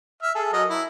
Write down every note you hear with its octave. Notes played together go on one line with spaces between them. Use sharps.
E5 F6
G#4 A4
F#3 A#4 D#5
E4